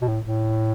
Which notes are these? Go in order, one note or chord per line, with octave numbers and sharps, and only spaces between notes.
B2
A2
A2